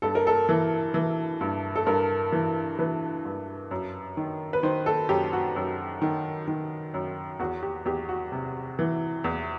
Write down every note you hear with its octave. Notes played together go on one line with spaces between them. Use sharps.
G2 A4
A#4
A4
E3
E3
G2
A4
G2 A#4
E3
E3 B4
G2
F#2
D#3
B4
D#3 C5
A4
F#2 G4
F#4
F#2
D#3
D#3
F#2
E2 F#4
G4
E2 G4
F#4
C3
E3
E2